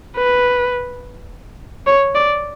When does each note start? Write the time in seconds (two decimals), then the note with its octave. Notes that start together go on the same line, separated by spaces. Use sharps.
0.17 B4
1.87 C#5
2.15 D5